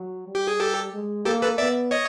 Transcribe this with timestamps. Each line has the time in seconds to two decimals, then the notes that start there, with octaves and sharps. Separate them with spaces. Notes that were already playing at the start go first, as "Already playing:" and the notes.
Already playing: F#3
0.27 G3
0.35 G4
0.48 G#4
0.60 G4 A4
0.93 G#3
1.25 A#3 G4 A4
1.42 A4 B4
1.58 B3 D5 E5
1.91 C#5 D#5